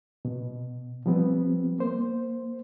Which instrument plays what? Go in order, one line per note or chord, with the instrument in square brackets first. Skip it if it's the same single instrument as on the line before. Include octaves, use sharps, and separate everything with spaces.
[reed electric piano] B2
F3 G3 B3 C4
A#3 C5